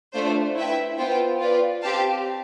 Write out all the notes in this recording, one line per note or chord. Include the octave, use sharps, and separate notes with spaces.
A3 D4 F4 C5
E4 B4 E5 G5
B3 F4 C5 G5
F4 B4 D5
C4 G4 C5 F5 A5